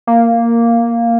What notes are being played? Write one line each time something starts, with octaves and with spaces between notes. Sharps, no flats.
A#3